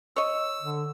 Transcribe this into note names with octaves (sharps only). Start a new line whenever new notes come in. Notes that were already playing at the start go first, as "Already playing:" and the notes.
C#5 D#5 E6
D3